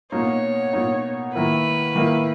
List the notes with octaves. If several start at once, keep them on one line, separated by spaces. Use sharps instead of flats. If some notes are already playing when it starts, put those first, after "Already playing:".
B2 A#3 D#4 C#5
B2 A#3 D#4
D#3 A#3 E4 A#4 B4
D#3 A#3 E4 A#4